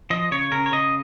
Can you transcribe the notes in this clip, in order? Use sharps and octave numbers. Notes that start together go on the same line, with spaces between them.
F3 D#5
C#3 C#5
C#3 A#4
C#5
C#3 D#5